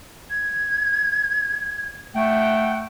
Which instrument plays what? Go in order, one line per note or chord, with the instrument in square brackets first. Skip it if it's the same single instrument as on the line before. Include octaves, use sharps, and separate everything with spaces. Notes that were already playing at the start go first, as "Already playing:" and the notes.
[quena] G#6
[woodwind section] A3 G5 [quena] F#5